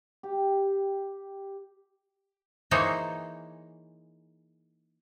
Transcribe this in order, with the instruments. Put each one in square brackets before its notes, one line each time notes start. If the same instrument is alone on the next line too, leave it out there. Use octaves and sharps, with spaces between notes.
[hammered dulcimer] G4
[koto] E3 A#3 D#4 G#4 C5 C#5